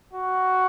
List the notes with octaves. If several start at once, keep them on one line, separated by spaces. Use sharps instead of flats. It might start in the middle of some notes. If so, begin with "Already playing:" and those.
F#4